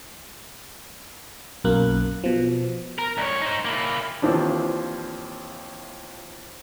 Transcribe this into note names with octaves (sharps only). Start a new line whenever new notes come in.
B1 F#2 A#3 F#6
B2 F3
A#4
C2 C#5
D#4 C5
A#3 E4
D#2 E3 F3 C4 D4